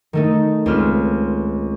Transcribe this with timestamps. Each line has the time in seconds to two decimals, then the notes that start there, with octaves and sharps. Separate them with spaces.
0.13 D#3 A3 D#4
0.66 C#2 C4 B4 C6 F6